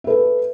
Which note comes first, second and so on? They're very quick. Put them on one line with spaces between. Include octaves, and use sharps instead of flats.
E5 B4 A4